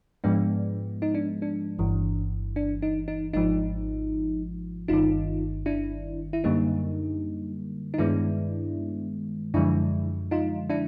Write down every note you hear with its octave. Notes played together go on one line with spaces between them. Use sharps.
G#2 F3 G#3 B3 D4
D#4
D4
D4
G1 G2 E3
D4
D#4
D#4
G#1 G#2 F3 D#4
G1 G2 D#3 D#4 F4
D4 E4
E4
F#2 D3 G3 A#3 D#4
D#4
G2 D#3 G#3 B3 D4 E4
F#2 D3 F3 G#3 D4 E4
D#4 F4
D4 E4